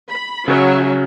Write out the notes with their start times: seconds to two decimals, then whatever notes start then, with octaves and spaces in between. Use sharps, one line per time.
0.11 B5
0.48 C#3 F#3 C#4 F#4 E5